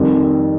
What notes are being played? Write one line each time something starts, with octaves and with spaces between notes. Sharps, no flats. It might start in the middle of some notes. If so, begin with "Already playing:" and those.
Already playing: F2 D#3 G3